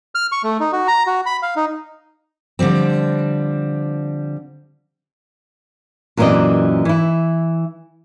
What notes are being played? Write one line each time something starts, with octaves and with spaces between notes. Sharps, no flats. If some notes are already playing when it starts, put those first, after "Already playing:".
F6
C#6
A3
D#4
F#4
A#5
F#4
B5
F5
D#4
D3 F3 G3 C4
F#2 A#2 E3 C4 D5 D#5
E3 E4